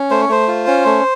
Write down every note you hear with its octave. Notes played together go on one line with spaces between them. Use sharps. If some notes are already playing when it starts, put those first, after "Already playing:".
Already playing: C#4
A3 C5
C#5
A3 C5
F4
C#4
A3